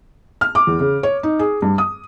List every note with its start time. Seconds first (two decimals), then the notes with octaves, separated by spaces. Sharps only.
0.41 F6
0.55 D6
0.67 E2
0.80 C#3
1.03 C#5
1.23 D#4
1.39 G#4
1.62 G2
1.78 D#6